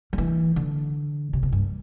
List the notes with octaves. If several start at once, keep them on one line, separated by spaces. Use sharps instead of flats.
F3
E3
D3
C3
B2
G2